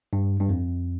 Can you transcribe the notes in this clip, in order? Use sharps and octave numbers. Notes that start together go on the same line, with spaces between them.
G2
G2
F2